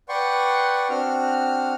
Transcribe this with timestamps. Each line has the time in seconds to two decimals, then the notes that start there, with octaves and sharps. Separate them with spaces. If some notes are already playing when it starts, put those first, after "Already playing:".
0.09 B4 D5 F#5 G5 C6 C#6
0.90 C4 D4 F#4 F6